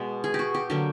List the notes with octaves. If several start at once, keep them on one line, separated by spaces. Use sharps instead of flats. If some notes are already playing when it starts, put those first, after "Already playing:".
Already playing: B2 G#3 B3
G#4
G4
F#4
G4
D3 F#3 A#3 G4